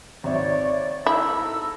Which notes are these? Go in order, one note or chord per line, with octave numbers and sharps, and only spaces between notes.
G#1 C#5 D5 E5
G#2 E4 A4 A#5 E6